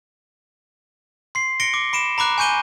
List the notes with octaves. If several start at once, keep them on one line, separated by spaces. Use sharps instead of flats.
C6 C7
A#6 C#7 D7 G7
D6
B5 D7 E7
A#5 B5 D6 F#6
G#5 C#6 G6 D#7 G7